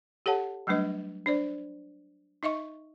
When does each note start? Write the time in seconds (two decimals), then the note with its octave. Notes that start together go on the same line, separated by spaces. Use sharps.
0.26 G4 A4 C#5 F#5 A5
0.67 F#3 G3 A3 D4 B4 D#5
1.26 D4 C5 D5
2.43 D#4 D#5 E5 C#6